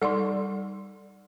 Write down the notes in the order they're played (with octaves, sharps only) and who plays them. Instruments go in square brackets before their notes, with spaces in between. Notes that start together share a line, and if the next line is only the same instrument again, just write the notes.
[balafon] G3 D#4 D5 [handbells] A4 C6